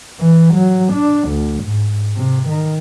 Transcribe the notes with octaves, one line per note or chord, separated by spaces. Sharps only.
E3
F#3
D4
D2
G#2
C3
D#3